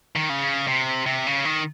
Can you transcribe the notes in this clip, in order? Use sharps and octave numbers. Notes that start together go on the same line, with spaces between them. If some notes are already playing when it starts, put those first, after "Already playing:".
D#3
C#3
C3
C3
C#3
D#3